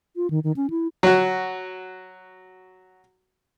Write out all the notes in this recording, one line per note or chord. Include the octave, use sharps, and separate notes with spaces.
F4
D#3
D#3
C#4
E4
F#3 F#4